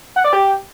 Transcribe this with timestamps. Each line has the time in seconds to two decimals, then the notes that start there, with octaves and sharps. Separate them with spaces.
0.16 F#5
0.24 D5
0.33 G4